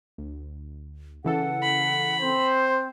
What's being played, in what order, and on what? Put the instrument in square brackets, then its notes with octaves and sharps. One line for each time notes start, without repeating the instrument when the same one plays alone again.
[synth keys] D2
[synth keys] C#3 E3 A4 [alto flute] F#5
[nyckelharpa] B5
[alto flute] C4 [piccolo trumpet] C5